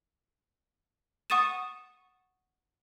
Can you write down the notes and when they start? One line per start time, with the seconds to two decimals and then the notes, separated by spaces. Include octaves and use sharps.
1.30 F#5 C#6 D#6 A6 D#7 E7